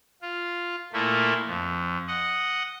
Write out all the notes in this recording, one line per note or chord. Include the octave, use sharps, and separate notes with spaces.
F4
A#2 A3 A#3 E4
F2
D#5 F#5